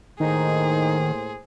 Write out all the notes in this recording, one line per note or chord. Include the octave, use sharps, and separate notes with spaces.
A2 D#3 A#3 D#4 G#4 C5